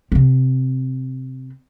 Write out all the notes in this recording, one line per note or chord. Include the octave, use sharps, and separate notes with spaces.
C3 C4